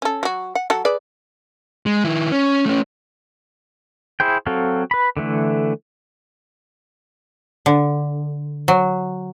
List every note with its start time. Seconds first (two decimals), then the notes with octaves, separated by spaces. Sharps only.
0.02 C#4 A4
0.23 F#3 F#4
0.55 F#5
0.70 F#3 A4 F#5
0.85 G#4 B4 D5
1.86 G#3
2.04 D#3 E4
2.31 C#4
2.66 A3 C#4
4.20 E4 G#4 C5 G5
4.46 F#3 C4 F#4 A4 F5
4.91 B4 B5
5.17 D3 E3 A3
7.66 D3
8.68 F#3